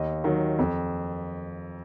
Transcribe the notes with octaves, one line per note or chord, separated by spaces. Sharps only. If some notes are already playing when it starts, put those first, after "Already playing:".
Already playing: D#2 D#5
D#3 F#3
F2